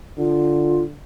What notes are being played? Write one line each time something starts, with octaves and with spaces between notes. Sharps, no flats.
D3 F4